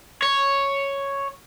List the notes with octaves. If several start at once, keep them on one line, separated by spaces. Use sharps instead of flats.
C#5